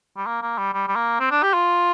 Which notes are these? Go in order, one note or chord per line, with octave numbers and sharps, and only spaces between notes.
G3
A#3
A#3
G3
G3
G3
A#3
C4
D4
G4
F4